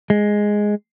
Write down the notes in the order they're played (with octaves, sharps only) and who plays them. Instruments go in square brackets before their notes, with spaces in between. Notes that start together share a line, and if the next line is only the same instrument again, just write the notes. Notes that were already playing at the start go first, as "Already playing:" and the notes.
[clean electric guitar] G#3